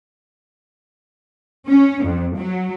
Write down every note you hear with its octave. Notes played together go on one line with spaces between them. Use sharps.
C#4
F2
F#3